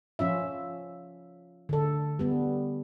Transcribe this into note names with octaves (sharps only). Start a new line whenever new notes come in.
F3 C#4 F4 E5
D3 A4
G3 B3